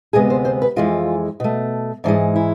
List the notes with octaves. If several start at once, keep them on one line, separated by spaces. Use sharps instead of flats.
D2 C3 G#3 B3 G#4
C5
C5
B4
F2 E3 G#3 F4
B2 A3
G#2 E3 G#3 D4
E4